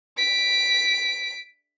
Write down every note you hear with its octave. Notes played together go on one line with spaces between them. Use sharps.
B6 D7